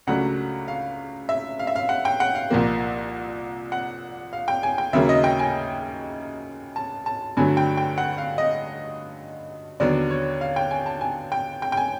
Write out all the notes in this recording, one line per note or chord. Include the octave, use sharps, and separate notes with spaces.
C#2 C#3 F#3 A3 D4 F#5
F5
E5
F5
E5
F5
F#5
G5
F#5
F5
C2 A#2 F3 A#3
F#5
F5
G5
G#5
G5
D#2 C#3 F#3 A#3 E5
D#5
G5
G#5
A5
A5
G2 D3 F#3 A3 G#5
G5
G5
F#5
F5
D#5
D#2 D3 F#3 B3 D4 D5
C#5
F5
G5
G#5
A5
G#5
G5
G5
G5
G#5